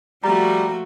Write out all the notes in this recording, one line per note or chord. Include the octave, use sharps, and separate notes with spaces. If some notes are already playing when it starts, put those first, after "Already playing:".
F3 G3 A3 F#4 A#5